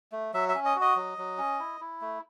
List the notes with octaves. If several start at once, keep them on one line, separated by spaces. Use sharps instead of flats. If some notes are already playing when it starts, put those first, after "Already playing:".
A3
F#3 E5
E5
C#4
D#5
F#4
D#5
F#3
F#3
C#4
E4
E4
A3